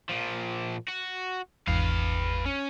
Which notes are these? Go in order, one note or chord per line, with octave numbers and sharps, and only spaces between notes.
A#2 F3
F#4
G#1 E2 B4 F5
C#4